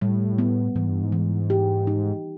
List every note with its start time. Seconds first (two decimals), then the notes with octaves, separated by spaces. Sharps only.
0.01 A2 G3
0.38 B3
0.75 G#2 E3
0.89 G2
1.03 G#2
1.12 E3
1.50 G4
1.87 D#4